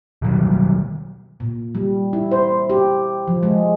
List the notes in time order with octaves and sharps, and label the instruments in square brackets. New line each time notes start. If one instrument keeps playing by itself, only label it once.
[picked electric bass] B2 D#3 F#3 G3
[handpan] A#2
G3
E4
C5
G4
F3
G#3